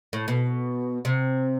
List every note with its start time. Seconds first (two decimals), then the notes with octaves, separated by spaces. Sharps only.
0.13 A2
0.28 B2
1.05 C3